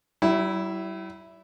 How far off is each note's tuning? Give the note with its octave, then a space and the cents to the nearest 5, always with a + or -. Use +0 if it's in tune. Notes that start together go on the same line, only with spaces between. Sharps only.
G3 -45 E4 +0